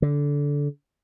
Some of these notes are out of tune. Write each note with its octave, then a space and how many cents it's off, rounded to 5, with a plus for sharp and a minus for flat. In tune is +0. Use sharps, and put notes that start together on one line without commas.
D3 -20